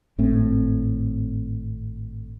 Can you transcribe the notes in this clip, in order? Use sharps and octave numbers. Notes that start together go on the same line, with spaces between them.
G#1 A2 A3 C4